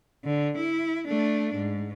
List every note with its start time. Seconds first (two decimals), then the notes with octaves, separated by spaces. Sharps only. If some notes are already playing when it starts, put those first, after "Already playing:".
0.25 D3
0.57 E4
1.07 A3 D4
1.55 G#2